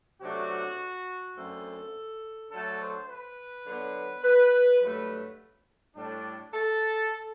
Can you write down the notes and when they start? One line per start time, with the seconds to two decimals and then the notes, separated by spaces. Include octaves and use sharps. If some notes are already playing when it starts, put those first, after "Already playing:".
0.22 C3 F#3 A3 D4 F#4
1.36 F#2 D3 A3 C4 A4
2.52 D3 F#3 A3 A4
2.81 C5
3.09 B4
3.67 D3 F#3 B3
4.24 B4
4.81 G2 F#3 A3 B4
5.96 A2 G3 D4
6.54 A4